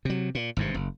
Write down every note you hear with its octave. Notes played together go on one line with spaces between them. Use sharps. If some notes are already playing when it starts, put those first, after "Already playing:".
C3 F#3
A#2
G#1 G2 C3
F#1